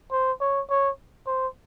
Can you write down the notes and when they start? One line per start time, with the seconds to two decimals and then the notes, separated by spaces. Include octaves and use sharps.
0.12 C5
0.41 C#5
0.70 C#5
1.27 C5